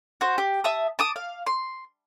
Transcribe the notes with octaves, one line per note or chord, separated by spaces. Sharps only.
F#4 C5
G4
E5 A5 D#6
A5 D6 D#6
F5
C6